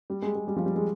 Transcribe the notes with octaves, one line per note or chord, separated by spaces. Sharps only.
G3
G#3
G#3
G3
F3
G3
G#3